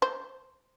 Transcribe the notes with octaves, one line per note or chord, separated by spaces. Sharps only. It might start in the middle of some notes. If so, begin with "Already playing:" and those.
C5